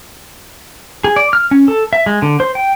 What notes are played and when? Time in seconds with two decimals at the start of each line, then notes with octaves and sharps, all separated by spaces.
1.04 G#4
1.16 D5
1.33 F6
1.51 C#4
1.68 A4
1.93 E5
2.06 G#3
2.22 D3
2.40 C5
2.55 G5